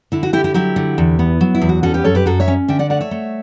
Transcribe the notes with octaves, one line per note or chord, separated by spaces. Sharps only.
D3 E4
F#4
D3 E4 G4
E4 G4
F#3 E4 G4
D3
E2
B3
F#3
E4
E2
F#4
C#4 F#4 A4
G4 B4
F#2 A4 C#5
G4 B4
F#2 F#4 A4
C#5 E5
C#4
D3 E5 G5
D5 F#5
A3 D5 F#5
C#5 E5
A3